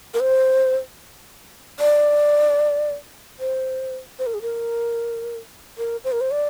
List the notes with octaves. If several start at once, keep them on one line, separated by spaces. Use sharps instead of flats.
A#4
C5
D5
C5
C5
A#4
G#4
A#4
A#4
C5
A#4
C5
D5